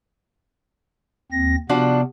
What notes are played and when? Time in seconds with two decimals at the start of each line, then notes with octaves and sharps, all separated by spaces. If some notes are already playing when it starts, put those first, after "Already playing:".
1.32 D#2 C4 A#6
1.69 C3 F3 B3 D4 F#4